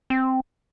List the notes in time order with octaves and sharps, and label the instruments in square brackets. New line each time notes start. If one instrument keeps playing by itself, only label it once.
[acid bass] C4